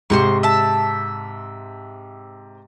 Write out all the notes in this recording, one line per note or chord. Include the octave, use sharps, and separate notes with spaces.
G#2 C3 C5 C6 C#6
E5 A5